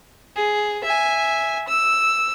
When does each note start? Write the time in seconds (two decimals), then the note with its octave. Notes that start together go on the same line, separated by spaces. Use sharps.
0.36 G#4
0.84 E5 G#5
1.68 E6